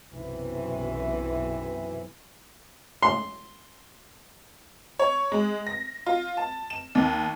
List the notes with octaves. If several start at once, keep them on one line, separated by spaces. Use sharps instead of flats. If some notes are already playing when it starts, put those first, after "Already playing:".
B1 F#2 C3 E3
C6
C#5
G#3
A#6
F4
A5
E7
D#2